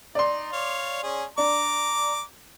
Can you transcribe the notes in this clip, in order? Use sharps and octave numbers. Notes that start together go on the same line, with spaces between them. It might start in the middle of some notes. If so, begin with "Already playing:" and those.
D#4 D5 C6
C#5 F5
C#4 G#4
D4 A#5 D6